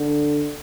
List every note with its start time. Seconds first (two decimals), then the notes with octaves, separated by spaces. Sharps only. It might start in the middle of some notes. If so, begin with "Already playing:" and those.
Already playing: D3